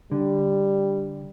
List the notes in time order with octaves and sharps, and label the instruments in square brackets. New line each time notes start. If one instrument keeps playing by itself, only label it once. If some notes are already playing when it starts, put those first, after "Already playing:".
[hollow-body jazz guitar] D3 [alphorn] G3